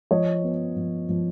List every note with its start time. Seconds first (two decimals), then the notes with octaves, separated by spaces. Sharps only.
0.11 F3 C#5 D#5
0.44 B3
0.76 F3
1.09 F3